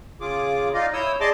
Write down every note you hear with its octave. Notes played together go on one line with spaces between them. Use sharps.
C#3 F4 G#4 D6
D#4 F4 D5 D#5 F5
E4 C#5 D#6 E6 G6
G#4 D5 D#5 A5 C6 D6